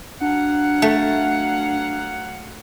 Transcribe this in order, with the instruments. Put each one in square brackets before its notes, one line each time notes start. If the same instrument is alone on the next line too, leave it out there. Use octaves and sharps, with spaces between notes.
[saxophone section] F#3 F5 F#5 [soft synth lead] D4
[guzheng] A3